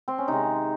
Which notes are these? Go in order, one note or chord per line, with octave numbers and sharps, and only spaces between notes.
C4
C#4
C3 D#3 G#3 D#4